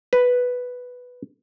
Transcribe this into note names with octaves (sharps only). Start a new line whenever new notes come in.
B4